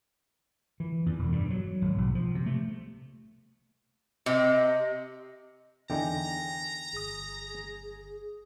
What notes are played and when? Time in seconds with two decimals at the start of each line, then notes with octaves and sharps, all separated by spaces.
0.80 E3
1.06 E2
1.19 E1
1.32 G2
1.50 F#3
1.82 G#1
1.98 B1
2.15 F3
2.35 C3
2.46 A3
4.26 C3 D#5
5.90 E2 D3 D#4 G5 G#5 A#5
6.93 G1 G#4 D#6